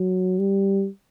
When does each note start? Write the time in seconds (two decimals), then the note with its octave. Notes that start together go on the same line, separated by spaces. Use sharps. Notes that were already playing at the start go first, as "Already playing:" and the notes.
Already playing: F#3
0.39 G3